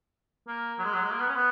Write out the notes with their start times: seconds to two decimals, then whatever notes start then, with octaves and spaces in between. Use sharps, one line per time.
0.48 A#3
0.79 F#3
0.85 G#3
0.93 F#3
1.03 G#3
1.11 A#3
1.20 B3
1.28 C#4
1.35 B3